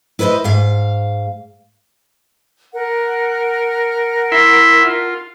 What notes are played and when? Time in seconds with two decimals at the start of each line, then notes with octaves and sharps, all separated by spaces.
0.19 E4 B4 C5 D5 D#5
0.44 G#2 F5
2.72 A#4 F#5
4.32 E4 E5 C6
4.85 F4